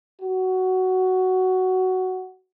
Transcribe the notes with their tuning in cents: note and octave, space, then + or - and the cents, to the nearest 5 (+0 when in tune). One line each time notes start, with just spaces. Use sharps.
F#4 +10